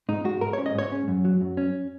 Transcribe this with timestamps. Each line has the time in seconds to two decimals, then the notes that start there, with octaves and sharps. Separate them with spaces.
0.09 G#2 D#4
0.25 G#3 F#4
0.41 G#2 A#4
0.53 C#5
0.58 C#4
0.66 D#5
0.75 G#2 C#5
0.92 C#4
1.08 F#2
1.25 F#3
1.41 F#2
1.57 C#4